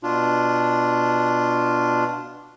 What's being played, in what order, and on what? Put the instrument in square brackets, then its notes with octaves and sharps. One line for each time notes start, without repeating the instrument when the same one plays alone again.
[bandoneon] B2 D4 F4